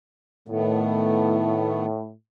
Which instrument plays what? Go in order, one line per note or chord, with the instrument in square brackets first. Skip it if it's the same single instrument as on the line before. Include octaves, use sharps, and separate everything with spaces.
[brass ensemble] A2 [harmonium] D#3 A3 B3